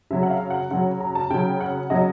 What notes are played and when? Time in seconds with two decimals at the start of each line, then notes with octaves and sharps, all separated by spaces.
0.11 C#3 F#3 E5
0.23 F#5
0.30 F5
0.50 F#5
0.71 C#3 F#3 F#5
1.00 A#5
1.15 A5
1.30 C#3 F#3 G5
1.61 F#5
1.90 C#3 F#3 D#5